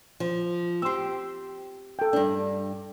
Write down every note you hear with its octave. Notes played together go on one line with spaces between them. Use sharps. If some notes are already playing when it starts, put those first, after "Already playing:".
F3
C4 G4 C6 E6
A4 G5
G2 D4